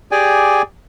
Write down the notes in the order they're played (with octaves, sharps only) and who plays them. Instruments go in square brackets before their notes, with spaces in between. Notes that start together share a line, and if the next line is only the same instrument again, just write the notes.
[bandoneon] G4 G#4 D5 G5 G#5